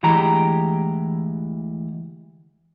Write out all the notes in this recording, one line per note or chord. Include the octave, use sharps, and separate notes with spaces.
D2 E3 G#3 G4 A#5